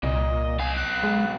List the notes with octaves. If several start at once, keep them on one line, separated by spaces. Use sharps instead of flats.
C2 A#2 D#5
B1 F5 G#5
F#6
G#3